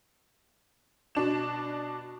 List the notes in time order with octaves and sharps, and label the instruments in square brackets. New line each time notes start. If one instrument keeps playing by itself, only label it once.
[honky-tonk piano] B2 D4 E7